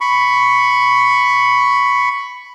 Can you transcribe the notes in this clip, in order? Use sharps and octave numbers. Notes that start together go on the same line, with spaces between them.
B5 C#6